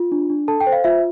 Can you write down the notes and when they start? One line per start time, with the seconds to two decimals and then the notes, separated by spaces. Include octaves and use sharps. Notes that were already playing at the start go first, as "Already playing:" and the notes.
Already playing: F4
0.12 D4
0.30 D4
0.48 A4 A5
0.61 G5
0.67 C5
0.72 F5
0.84 F4 E5